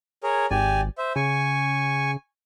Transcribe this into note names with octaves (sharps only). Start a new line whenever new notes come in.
G#4 A#4 C#5
G#1 G4 D5 G#5
C5 E5
C#3 G#5 C#6